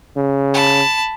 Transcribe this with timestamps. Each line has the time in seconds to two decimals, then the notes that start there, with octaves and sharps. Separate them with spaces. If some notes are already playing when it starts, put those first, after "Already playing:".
0.17 C#3
0.54 A5 B5